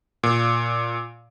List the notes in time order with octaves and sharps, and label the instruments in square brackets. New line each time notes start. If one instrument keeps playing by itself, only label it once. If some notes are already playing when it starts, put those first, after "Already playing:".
[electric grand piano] A#2